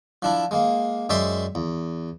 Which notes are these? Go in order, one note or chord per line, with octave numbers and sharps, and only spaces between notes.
F3 D4 E4
G#3 A#3
F#2 G#3 D5 E5 G5 C6
E2